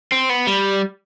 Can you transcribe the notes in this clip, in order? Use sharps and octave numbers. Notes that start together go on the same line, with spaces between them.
C4
B3
G3